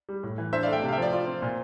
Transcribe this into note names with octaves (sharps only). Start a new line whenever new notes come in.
G3
A2
E3
D4 C5 E5
D5 F5
A3 E5 G5
C3
F5
E5 G5
F3 D5
F4 D5
C4
A#2